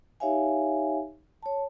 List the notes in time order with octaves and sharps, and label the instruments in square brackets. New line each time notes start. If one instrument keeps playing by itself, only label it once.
[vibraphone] D#4 G4 C#5 E5 F5 G#5
C#5 A5